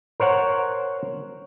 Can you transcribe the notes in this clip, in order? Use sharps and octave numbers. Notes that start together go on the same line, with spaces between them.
A#4 C5 C#5 F#5